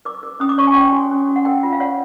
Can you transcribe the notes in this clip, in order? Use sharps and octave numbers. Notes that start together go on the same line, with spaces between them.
A#4 D6
A#4
C#4 D#6
D6
C#5 C#6
G#5
C#5 G5
G#5
F#4
C#4
F#4
F#5
A#4 G5
F4
F5
C#5 F#5